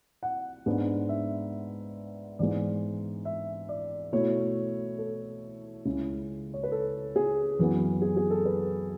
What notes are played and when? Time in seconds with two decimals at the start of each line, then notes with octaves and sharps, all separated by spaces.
0.23 F#5
0.66 G#2 G#3 B3 D4
1.09 E5
2.39 G#2 E3 G#3 B3 D5
3.25 E5
3.69 D5
4.12 B2 A3 E4 C#5
4.98 A4
5.85 C#2 C#3 G#3 C#4 E4
6.54 C#5
6.64 B4
6.72 A4
7.16 G#4
7.59 F#2 E3 B3
8.02 G#4
8.17 G#4
8.30 A4
8.46 B4